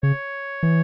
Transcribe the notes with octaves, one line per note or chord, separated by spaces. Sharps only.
C#3 C#5
E3